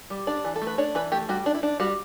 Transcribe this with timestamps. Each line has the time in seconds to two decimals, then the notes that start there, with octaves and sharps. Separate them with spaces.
0.10 G3
0.27 D4 D5
0.45 E3
0.56 A4
0.62 A3
0.67 B4
0.78 D4 C#5
0.95 E3 B4
1.12 A3 G4
1.29 G3 F#4
1.46 D4
1.55 E4
1.63 D4
1.80 G3 F#4